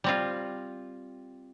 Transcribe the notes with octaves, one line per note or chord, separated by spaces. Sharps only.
G3 C4 F4